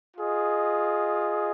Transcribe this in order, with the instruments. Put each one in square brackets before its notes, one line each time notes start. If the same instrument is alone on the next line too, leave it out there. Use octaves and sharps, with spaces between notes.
[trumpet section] F4 G#4 D#5